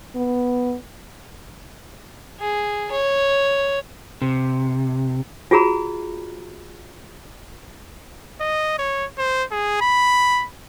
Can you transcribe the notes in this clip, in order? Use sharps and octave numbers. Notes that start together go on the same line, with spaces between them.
B3
G#4
C#5
C3
F4 F#4 G#4 A#5 B5
D#5
C#5
C5
G#4
B5